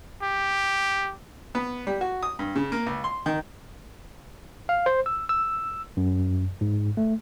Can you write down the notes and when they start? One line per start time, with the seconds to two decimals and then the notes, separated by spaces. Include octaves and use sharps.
0.22 G4
1.55 B3
1.87 G3
2.01 F#4
2.23 D#6
2.39 G2
2.56 C#3
2.72 A#3
2.86 C#2
3.04 C6
3.26 D#3
4.69 F5
4.86 C5
5.06 E6
5.29 E6
5.97 F#2
6.61 G#2
6.97 A3